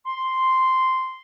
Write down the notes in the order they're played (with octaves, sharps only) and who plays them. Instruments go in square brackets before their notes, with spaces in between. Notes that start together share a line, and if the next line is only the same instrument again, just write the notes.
[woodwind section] C6